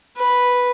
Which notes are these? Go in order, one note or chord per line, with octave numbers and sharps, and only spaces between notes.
B4